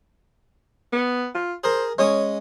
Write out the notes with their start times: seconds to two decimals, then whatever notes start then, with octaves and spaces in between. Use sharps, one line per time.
0.93 B3
1.35 F4
1.64 G#4 A#4 C5
1.99 G#3 C#4 C#5 D#6